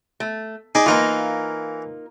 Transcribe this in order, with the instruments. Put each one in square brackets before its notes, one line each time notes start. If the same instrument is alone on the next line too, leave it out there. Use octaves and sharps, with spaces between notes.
[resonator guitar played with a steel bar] A3
[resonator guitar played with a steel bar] D#4 [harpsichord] G#4 D5
[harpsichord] E3 A#4 [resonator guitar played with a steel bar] A#3 D#4 F4